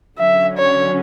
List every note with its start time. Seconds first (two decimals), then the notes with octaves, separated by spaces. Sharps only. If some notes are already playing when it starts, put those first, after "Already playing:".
0.18 D3 F#3 C#4 E5
0.58 C#5